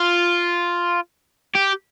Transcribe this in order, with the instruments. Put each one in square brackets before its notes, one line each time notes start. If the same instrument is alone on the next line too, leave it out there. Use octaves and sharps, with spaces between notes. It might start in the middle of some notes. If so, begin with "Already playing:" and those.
Already playing: [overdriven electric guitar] F4
G4